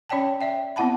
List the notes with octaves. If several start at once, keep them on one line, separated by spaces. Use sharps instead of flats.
C#4 C#5 D5 G5 A5
D5 E5 G5
B3 C4 E4 F#5 A5 B5